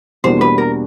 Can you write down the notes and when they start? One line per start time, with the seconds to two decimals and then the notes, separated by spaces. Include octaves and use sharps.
0.24 E2 B2 G3 A#3 D4 C5
0.41 B4
0.58 A#4